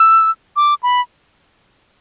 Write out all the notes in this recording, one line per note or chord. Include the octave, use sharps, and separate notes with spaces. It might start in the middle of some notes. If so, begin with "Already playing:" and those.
Already playing: E6
D6
B5